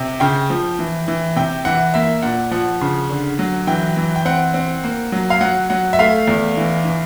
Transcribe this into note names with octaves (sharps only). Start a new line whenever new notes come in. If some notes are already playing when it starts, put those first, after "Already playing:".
Already playing: C3
C#3 G5
F3
E3
E3
C3 G5
E3 F#5
A#3 E5
A#2 F#5
F3 F#5
C#3
D3
F#3
E3 G5
E3
G5
C4 F#5
C4
A#3
F#3
F5
F#3 F#5
F#3 F#5
E5
A3 F5
E2
E3
E3